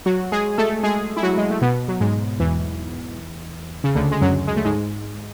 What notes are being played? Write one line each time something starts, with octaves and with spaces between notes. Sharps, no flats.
F#3 F#4
G#3 G#4
A3 A4
G#3 G#4
E4
F#3 F#4
G#3
A3
B2 B3
F#3
G#2 G#3
E2 E3
C#3
D2 D3
G#3
F#2 F#3
G#3
A3
G#2 G#3